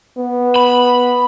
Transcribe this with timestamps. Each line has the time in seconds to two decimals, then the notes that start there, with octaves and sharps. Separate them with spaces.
0.17 B3
0.56 B5